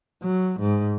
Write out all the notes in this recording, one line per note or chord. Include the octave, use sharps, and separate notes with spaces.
F#3
G#2